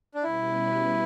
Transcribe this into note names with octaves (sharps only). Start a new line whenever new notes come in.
D4
B2 G3 C#4 E4 G4 B4